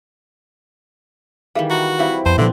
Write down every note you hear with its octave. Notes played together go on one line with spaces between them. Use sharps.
D#3 E3 G3 G#4 E5 F5
E4 F#4
G3 C4 E4 F4 E5 F5
F2 B3 C5 A5
A#2 D3 F3 B3 C4 E5 C6